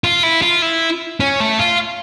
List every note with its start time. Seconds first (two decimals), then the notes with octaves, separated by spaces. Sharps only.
0.04 F4
0.23 E4
0.42 F4
0.62 E4
1.20 C#4
1.40 A3
1.59 F4